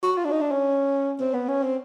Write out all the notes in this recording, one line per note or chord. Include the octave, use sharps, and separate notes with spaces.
F#4
F4
D4
D#4
D4
C#4
C4
B3
C#4
C4